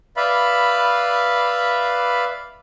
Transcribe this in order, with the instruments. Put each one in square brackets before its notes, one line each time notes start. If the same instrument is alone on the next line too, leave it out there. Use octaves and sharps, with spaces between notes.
[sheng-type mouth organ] B4 D5 E5 F5 B5